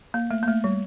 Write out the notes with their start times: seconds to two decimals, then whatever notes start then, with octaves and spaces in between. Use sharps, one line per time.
0.14 A#3
0.31 A3
0.43 A#3
0.48 A3
0.64 G3